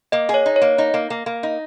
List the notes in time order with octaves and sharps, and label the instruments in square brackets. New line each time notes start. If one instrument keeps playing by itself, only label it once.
[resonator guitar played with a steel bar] A#3 [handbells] D#5
[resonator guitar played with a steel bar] G#4
[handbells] C#5
[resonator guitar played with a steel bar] D#4
[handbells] C#5
[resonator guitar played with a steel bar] A#3
D#4
A#3
A#3
A#3
D#4